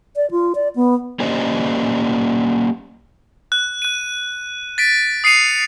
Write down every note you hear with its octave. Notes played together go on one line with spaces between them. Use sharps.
D5
F4
D5
B3
A#3 C#4 G4 C5 D5 D#5
F#6
F#6 D#7
A6 B6 D7
D#6 C7 C#7 D#7 F7